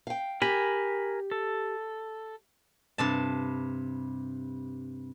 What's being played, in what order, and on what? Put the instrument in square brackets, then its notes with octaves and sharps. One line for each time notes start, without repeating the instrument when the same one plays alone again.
[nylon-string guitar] F5 G5
[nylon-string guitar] G4 [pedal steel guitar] A#4 G#5 B5
[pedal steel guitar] A4
[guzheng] G2 C3 A5